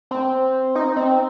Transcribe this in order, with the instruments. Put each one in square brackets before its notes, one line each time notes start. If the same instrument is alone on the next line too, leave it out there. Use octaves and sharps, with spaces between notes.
[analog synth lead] C4
D#4
C4